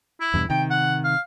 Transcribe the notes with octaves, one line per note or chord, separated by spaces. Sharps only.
E4
E2 G2 B2
C3 D#3 G5
F#5
F5